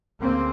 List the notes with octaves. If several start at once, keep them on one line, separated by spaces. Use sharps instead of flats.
D2 C#3 A#3 C4